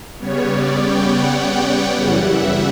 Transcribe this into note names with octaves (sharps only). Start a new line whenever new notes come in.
C#3 G3 B3 C#5
D5
G5
F#5
G5
F#2 C#3 E3 G3 F#5
E5